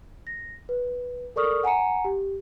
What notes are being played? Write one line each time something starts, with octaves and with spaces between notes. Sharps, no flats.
A#6
B4
A4 A#4 D5 C#6 D#6 F6
F#5 G#5 A#5 C#7
G4